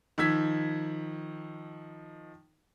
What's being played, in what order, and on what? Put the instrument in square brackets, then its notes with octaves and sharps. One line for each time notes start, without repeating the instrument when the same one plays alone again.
[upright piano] D#3 F3 E6 G#6 B6